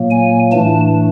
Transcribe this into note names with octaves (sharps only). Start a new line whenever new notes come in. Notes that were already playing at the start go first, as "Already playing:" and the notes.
Already playing: A#2 F#3 A#3
G#5
A2 E3 A3 D4 A5